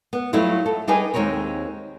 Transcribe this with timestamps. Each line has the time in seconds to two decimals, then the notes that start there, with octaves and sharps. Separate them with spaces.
0.13 B3
0.33 F#3 G3 A3 E4 F4
0.66 A4
0.88 G3 D4 D#4 G#4 B4 G#5
1.14 D#2 G#3 C4 A#4 C#5